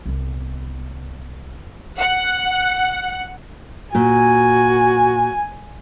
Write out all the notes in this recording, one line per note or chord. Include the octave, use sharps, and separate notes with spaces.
C2 B3
F#5
A#2 F#4 G#5